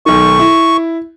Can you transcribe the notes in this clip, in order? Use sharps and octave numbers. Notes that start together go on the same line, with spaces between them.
B1 D#3 C#6
E4